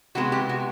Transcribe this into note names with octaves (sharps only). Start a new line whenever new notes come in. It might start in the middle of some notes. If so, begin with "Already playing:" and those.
C3 D#3 G#3 B3 F#4
G4
F#4